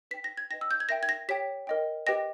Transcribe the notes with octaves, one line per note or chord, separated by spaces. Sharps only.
B4 G5 B6
A#6
G#6
B4 D#5 G5 A#6
E6
G6
G#6
A#4 E5 G5 A#6
G#6
A#6
G4 C#5 G5 B6
A#4 D#5 G5
G4 B4 D#5 G5 A#6